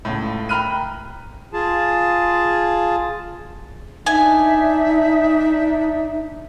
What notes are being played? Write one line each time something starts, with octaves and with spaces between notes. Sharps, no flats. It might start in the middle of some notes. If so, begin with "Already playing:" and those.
C#2 A2
G5 A#5 B5 F6 F#6 D#7
F4 G#4 A5
D4 D#4 E5 G#5